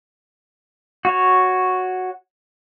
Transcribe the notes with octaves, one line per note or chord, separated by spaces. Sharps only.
F#4 C#5